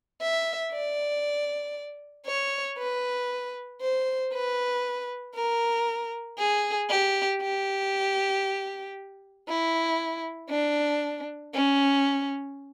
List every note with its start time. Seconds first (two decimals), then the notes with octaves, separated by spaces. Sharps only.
0.22 E5
0.72 D5
2.27 C#5
2.79 B4
3.81 C5
4.33 B4
5.35 A#4
6.39 G#4
6.90 G4
7.42 G4
9.48 E4
10.50 D4
11.54 C#4